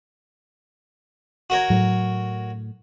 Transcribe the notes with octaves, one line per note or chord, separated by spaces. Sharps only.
F#4 A#4 C#5
A2 F#3